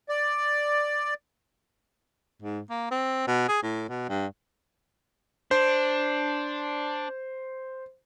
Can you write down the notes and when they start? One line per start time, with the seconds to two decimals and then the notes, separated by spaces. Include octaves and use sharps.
0.09 D5
2.42 G#2
2.70 A#3
2.91 C4
3.27 B2
3.48 G#4
3.63 A2
3.89 B2
4.09 G2
5.51 D4 C5